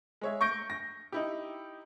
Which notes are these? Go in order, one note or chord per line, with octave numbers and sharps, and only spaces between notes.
G#3 C#5 E5
C#6 G6 A#6 D7
A#6
D#4 E4 G4